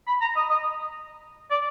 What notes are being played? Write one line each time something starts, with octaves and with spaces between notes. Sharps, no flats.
B5
A#5
D#5
D#5
D5